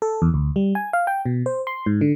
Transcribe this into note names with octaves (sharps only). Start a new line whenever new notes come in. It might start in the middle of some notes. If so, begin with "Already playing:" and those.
A4
E2
D2
G3
G#5
F5
G5
B2
C5
C6
G#2
D3